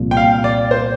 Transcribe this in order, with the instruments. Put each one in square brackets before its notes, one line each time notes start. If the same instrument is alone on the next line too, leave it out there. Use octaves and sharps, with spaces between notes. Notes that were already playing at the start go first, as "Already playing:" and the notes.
Already playing: [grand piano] C2 A#2 F3
[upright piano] G5
F5
D5
C5